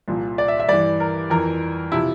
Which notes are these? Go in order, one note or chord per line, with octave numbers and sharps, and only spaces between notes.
C2 A#2 F3
D5
E5
E5
G2 E3 D5
A#4
F2 E3 A#4
C3 F3 E4